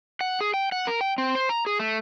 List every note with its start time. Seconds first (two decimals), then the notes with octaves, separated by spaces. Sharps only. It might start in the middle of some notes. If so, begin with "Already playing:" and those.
0.21 F#5
0.41 G#4
0.54 G5
0.72 F#5
0.87 A#4
1.01 G5
1.18 C4
1.35 C5
1.49 A#5
1.67 G#4
1.79 A3